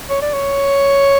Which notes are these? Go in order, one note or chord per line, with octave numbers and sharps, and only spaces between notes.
C#5
D5
C#5